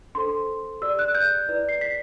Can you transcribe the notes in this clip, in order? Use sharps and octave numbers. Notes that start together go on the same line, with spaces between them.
D4 A4 C5 C6
G4 D5 E6
F#6
G6
E4 B4 D5
C7
B6